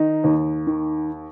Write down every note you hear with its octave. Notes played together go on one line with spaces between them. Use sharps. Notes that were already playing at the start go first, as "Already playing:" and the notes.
Already playing: D#3 D#4
D#2
D#3